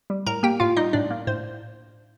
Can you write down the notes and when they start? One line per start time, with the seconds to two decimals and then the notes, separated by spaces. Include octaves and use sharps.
0.10 G3
0.26 A2 A#4 A#5
0.43 A#3 G4 G5
0.60 A2 F4 F5
0.77 G3 D#4 D#5
0.93 A2 D4 D5
1.10 A#3
1.27 A2 C5